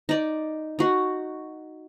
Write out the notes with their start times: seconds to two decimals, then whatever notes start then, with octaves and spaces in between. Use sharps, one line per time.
0.09 D#4 D5
0.79 D#4 F#4